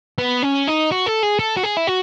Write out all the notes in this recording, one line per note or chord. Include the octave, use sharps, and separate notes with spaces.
B3
C#4
D#4
F#4
A4
G#4
A4
F#4
G#4
E4
F#4